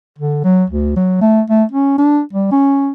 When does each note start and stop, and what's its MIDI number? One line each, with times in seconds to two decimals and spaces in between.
0.19 0.43 50
0.44 0.64 54
0.70 0.91 38
0.96 1.19 54
1.21 1.41 57
1.50 1.64 57
1.71 1.96 61
1.98 2.21 62
2.33 2.50 55
2.52 2.92 61